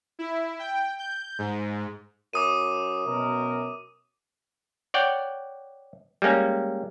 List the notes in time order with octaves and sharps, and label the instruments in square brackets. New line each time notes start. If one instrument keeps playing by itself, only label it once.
[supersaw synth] E4
G5
G6
G#2
[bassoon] F#2 [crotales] D6 D#6 D#7
[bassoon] F#2 [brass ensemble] B2 A#4
[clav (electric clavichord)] C#5 D5 F#5 G5
G3 G#3 A#3 C#4